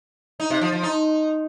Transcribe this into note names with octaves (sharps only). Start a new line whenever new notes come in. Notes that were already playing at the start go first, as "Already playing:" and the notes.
D#4
C3
F3
F3
D#4